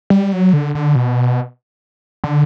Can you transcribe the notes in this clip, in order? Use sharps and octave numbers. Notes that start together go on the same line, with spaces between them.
G3
F#3
D3
D3
B2
D3